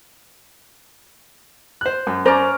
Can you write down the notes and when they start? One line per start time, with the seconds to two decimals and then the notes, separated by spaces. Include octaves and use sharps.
1.81 C5 F#6
2.07 F#2
2.26 C#4 C5 D5 A#5